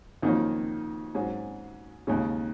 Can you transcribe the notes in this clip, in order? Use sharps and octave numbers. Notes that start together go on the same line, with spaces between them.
F2 D#3 F#3 A#3 C#4
G#2 F#3 C#4 G#4
D#2 C#3 G#3